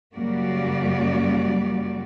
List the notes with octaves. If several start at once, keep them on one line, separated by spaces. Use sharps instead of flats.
F#2 C#3 G3 A#3 F#4 D5